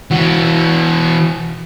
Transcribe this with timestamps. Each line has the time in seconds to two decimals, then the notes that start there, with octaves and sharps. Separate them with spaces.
0.11 E3 F#4